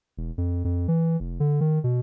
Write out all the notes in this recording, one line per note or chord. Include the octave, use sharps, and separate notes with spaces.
E1
F2
F2
E3
F1
D3
D#3
B2